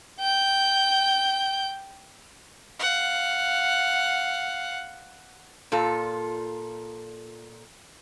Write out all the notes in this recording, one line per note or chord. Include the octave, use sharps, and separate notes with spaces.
G5 G6
F5 F#5
A#2 F4 A4